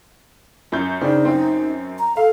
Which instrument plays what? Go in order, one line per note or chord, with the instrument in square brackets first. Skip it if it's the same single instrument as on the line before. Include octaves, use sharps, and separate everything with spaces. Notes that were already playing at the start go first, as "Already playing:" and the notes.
[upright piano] F#2 G6
[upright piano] C#3 C4 D4 [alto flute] D#4
[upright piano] F#2 C4
[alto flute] A#5
[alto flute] A4 [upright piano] F5